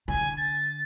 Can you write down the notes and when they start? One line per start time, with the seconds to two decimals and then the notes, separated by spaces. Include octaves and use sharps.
0.08 D3 G#5
0.37 A6